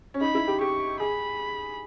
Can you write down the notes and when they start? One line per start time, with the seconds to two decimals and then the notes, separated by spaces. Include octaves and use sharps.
0.14 C#4
0.21 D#4 B5
0.35 E4
0.47 G4
0.61 G4 C#6
1.00 G#4 B5